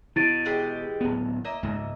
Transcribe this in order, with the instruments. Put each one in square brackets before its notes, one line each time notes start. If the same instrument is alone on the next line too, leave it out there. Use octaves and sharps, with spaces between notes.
[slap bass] B2 [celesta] E4 A6 D7
[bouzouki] E3 G#3 G4
[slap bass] D1 B3
[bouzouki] A#3 D#5 E5
[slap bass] C#2 G#2